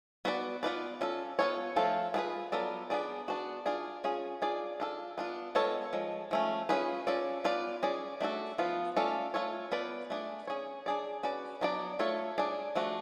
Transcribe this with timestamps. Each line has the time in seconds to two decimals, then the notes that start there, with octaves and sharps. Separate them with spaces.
0.25 B3 F#4 B4 D5
0.63 B3 F4 B4 D5
1.01 C#4 F4 A4
1.39 B3 F4 A4 C#5
1.76 F3 A3 F4 A4
2.14 B3 D4 F4 G#4 B4
2.52 F#3 B3 F4 A4 D5
2.90 B3 D4 G#4 D5
3.28 B3 D4 F#4
3.66 D4 F4 G#4 D5
4.04 C#4 F4 G#4
4.42 D4 F4 G#4 D5
4.80 D4 F4 A4
5.18 B3 D4 F4
5.55 G#3 B3 F4 A4 C#5
5.93 F3 G#3
6.31 F3 A3 C#4
6.69 C#4 F4 G#4 B4
7.07 C#4 F4 A4 D5
7.44 B3 F4 B4 D5
7.83 C#4 G#4 D5
8.21 A3 D4 F#4 A4
8.58 F3 B3 F4
8.96 A3 C#4 F4 A4 D5
9.34 A3 F4 A4 C#5
9.72 B3 F4 B4 D5
10.10 A3 D4 G#4 D5
10.47 C#4 G#4 C#5
10.86 D4 G#4 D5
11.23 C#4 F#4 B4 D5
11.61 F#3 B3 D4 G#4 D5
11.99 A3 F4 A4 C#5
12.38 D4 G#4 D5
12.75 F3 A3 D4 F#4